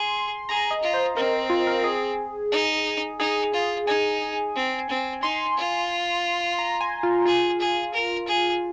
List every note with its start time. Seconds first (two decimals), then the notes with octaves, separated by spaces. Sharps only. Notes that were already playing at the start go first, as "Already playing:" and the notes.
Already playing: G#4 C6
0.49 G#4 A#5
0.71 D#5
0.82 F4
0.94 C5
1.17 C4 A#4
1.50 F4
1.67 A#4
1.84 G#4
2.51 D#4
3.19 D#4 G#4
3.54 F4
3.87 D#4 G#5
4.55 C4
4.89 C4
5.22 D#4 C6
5.57 F4
6.59 A#5
6.81 G#5
7.03 F4
7.26 F4 G#4
7.60 G#4
7.93 A#4
8.27 G#4